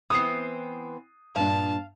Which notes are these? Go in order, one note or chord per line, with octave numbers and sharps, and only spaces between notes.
E3 B3 C4 D#6 C7
G2 A#2 D4 F5 A5